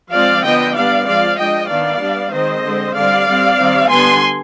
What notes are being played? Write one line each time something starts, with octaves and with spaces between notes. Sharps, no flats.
F3 G#3 C4 D5 F5
D3 F3 B3 D4 D#5 G5
G3 B3 D4 D5 F5
F3 G#3 C4 D5 F5
F3 G#3 D4 D#5 G5
D#3 B3 D4 D5 F5
G3 B3 D4
D#3 G#3 C4 C5 D#5
D3 G#3 C4
D3 G3 C4 D5 F5
G3 C4
D#3 G3 C4
D3 G3 B3 G#5 C6